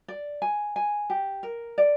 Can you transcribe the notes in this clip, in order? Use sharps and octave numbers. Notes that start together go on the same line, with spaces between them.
D5
G#5
G#5
G4
A#4
D5